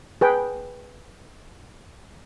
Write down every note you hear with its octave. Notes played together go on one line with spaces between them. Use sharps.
G#4 B4 G5